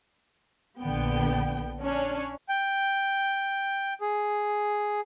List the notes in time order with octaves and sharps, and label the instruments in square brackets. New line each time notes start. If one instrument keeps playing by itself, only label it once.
[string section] A#1 D3 B3 G5
C#4 D4 C#5
[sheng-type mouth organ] G5
G#4